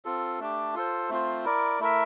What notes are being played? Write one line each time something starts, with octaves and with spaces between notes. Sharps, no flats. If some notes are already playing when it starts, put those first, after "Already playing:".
C4 F4 A4
A3 D4 G4
F4 A4 C5
A3 C4 F4 C5
E4 A#4 D5
A3 E4 A#4 E5